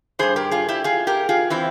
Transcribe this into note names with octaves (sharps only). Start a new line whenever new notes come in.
G2 E3 G#4 C5
G4 A#4
F4 G#4
E4 G4
F4 G#4
G4 A#4
F4 G#4
E3 C4 E4